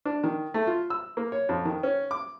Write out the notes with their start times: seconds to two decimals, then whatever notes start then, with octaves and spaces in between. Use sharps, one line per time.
0.05 D4
0.24 D#3
0.54 A3
0.67 F4
0.90 E6
1.17 A#3
1.32 C#5
1.49 F2
1.65 D#3
1.83 C#4
2.11 D6